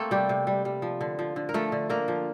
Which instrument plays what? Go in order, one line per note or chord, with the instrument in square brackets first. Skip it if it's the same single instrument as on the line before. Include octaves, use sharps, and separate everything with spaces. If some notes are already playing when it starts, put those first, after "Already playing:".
Already playing: [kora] A3 A#3 C4 A4 C5
C3 G3 G4
C3
G3
G3
F3
D3
F3
D3
A#4
F3 A3 A4
D3
D3 A#3 A#4
F3